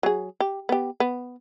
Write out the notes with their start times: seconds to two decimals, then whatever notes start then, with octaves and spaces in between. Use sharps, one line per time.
0.03 F#3 G#4
0.40 G4
0.69 B3 G4
1.00 B3